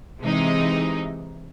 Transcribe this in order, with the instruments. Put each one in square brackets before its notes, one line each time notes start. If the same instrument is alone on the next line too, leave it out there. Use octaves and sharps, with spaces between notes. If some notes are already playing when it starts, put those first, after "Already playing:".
[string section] C3 E3 G#3 D#4